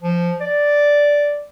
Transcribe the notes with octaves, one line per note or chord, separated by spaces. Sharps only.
F3
D5